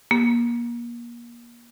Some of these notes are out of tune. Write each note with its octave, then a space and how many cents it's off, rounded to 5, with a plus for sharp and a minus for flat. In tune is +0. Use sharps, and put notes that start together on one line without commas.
A#3 +30